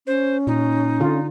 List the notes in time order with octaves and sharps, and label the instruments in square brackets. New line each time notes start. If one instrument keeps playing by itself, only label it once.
[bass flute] C#4 [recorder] C5
[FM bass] A#2 [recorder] D#4
[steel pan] D3 F4